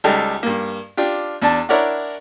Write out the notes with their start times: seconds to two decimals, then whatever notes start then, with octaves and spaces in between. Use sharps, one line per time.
0.04 C#2 G3 D#4 G4 A4 A#5
0.43 G2 A#3
0.97 D4 F4 G4
1.42 E2 D4 A5
1.69 D4 E4 A#4 C#5 D5 F#5